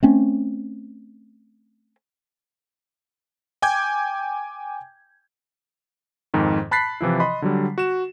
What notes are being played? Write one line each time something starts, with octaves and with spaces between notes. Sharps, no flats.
A3 C4 C#4
G5 G#5 D6 G6 G#6
F2 G#2 D#3
A5 B5 F#6 A6 B6 C7
C3 E3 F3 E4
D#5 B5 C6
D3 F#3 G3
F#4 E7